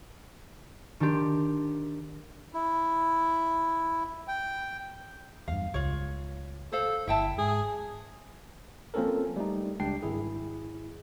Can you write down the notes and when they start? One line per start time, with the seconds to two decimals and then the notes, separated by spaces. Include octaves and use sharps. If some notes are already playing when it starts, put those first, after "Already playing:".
1.00 D#3 D4 G4 C6
2.54 E4
4.28 G5
5.48 E2 G2 F5
5.74 C#2 F4 C#5
6.72 A4 C5 F5
7.07 G1 E4 E5 G5 A5
7.38 G#2 G#4
8.94 F3 A#3 C4 C#4 A4 A#4
9.36 G3 A3 D#4
9.80 C#2 G3 D4 G5 C7
10.03 G#1 E4 G#4